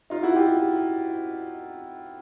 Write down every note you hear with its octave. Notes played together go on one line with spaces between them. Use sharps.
D#4 F4
E4 F#4
F4 G4